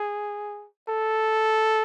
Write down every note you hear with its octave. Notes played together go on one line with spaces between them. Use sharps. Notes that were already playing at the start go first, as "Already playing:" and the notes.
Already playing: G#4
A4